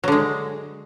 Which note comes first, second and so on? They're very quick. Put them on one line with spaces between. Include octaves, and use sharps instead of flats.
F#3 D3 G#3